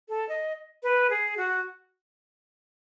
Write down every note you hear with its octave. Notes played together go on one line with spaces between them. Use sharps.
A4
D#5
B4
G#4
F#4